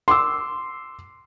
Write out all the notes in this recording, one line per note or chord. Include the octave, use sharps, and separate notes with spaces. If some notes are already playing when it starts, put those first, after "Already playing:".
C6 D6 E6